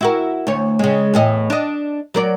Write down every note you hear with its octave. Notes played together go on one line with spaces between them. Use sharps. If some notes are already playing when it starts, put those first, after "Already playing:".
E4 F#4 A#4
D2 C#5
C#3 G#3
E2 A2 D#5
D4 D#5
F#3 A#4 D5